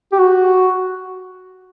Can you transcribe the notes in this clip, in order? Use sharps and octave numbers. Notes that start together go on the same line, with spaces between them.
G4
F#4